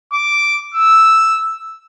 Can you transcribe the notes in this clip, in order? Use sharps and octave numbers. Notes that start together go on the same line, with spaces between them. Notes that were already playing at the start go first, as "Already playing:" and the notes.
D6
E6